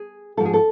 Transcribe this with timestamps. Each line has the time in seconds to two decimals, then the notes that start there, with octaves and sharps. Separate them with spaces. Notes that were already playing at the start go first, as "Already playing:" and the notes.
Already playing: G#4
0.37 G#2 F3 A4
0.45 G#4
0.53 A4